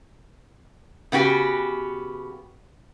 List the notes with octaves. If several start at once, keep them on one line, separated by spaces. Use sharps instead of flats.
C#3 B3 F#4 G4